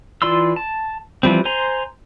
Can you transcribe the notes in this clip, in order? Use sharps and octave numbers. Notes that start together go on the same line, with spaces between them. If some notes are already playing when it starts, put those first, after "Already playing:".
E3 F4 D5 C6 E6
A5
E3 F3 G3 C4
C5 G#5 A#5 C6